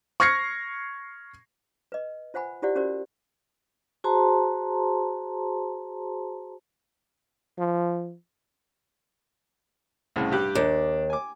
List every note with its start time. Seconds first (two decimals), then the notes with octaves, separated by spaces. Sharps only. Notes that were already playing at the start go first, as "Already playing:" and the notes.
0.20 C#6 F6 G#6 A#6 C7 C#7
1.92 B4 D#5
2.34 F4 C5 F#5 G#5 B5
2.62 E4 F4 G4 C5 D5 F#5
2.75 C#4 F#4 G4 A#4 C5 D5
4.04 F#4 G#4 C5 A5 A#5 C6
7.58 F3
10.16 C2 A2 C#3
10.31 G2 G4 F#6
10.55 D#2 D4
11.10 G#5 D6